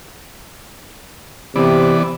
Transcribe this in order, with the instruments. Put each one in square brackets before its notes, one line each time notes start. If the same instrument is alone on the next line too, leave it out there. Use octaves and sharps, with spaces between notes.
[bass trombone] C3 [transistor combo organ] E3 B3 D5